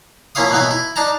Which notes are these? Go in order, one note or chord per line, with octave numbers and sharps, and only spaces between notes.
F3 A#3 C#4 E4 F5 D#6
B2 E3 F#3 B3 D#4 E4
E4
D4 D#4 A5 A#5